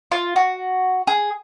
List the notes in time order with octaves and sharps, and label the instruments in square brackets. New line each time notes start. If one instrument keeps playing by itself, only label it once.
[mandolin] F4
F#4
G#4